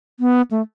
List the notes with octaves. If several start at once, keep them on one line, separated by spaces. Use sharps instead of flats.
B3
A3